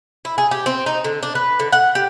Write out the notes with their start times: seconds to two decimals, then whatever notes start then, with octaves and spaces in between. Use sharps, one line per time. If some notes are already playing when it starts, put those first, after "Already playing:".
0.25 E4
0.38 G#4
0.51 G4
0.66 C4
0.86 D#4
1.04 D3
1.23 D4
1.35 B4
1.59 D3
1.72 F#5
1.95 G4